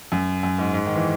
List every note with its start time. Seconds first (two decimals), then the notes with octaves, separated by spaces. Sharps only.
0.12 F#2
0.43 F#2
0.58 G#2
0.74 G#2
0.86 D#3
0.95 E3